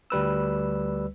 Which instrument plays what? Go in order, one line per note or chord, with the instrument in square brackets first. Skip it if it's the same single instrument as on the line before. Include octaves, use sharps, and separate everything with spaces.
[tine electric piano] D2 G3 B4 E6